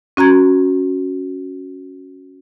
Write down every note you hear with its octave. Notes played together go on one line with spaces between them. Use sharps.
C#4 F#4 A#5 G#6